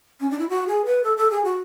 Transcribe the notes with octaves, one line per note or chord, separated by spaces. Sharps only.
C#4
D4
E4
F#4
G#4
B4
A4
A4
G#4
F#4